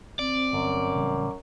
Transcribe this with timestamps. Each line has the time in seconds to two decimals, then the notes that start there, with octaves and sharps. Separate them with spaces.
0.19 C4 D5
0.53 G1 F#2
0.95 A1 C#3 G3